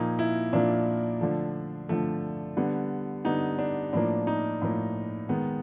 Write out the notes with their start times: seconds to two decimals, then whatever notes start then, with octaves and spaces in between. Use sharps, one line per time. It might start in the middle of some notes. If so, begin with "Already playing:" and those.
Already playing: A#2 F3 A#3 D#4
0.19 E4
0.53 A#2 F3 A#3 D4
1.21 D3 F3 A3
1.89 D3 F3 A3
2.57 D3 G3 B3
3.25 D3 G3 B3 D#4
3.59 D4
3.93 A2 F3 A#3 D4
4.27 D#4
4.62 A2 F3 A#3
5.29 D#3 G#3 B3